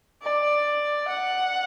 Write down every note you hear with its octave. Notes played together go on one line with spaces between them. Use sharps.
D5
F#5